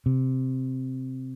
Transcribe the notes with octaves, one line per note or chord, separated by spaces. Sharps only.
C3